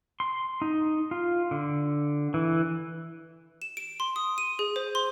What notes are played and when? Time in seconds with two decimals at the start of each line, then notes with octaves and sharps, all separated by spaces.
0.20 C6
0.62 D#4
1.11 F4
1.51 D3
2.34 E3
3.62 E7
3.77 D7
4.00 C6
4.16 D#6
4.38 D#7
4.59 G#4
4.76 C5
4.95 C6